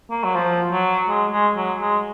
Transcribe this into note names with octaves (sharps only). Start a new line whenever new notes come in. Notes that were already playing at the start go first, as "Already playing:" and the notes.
A#3
F#3
F3
F#3
G#3
G#3
F#3
G#3